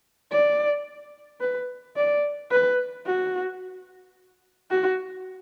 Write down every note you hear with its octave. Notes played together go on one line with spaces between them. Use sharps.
D5
B4
D5
B4
F#4
F#4